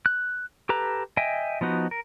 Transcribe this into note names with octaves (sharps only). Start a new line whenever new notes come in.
F#6
G4 A4 B4 A#5
D#5 E5 G5 G#5
F3 B3 D#4 F#4
A#4